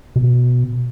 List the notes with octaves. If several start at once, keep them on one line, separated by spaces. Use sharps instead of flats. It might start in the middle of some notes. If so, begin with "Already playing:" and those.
B2